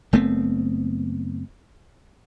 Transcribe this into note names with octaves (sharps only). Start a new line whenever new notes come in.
F#1 A3 B3 C4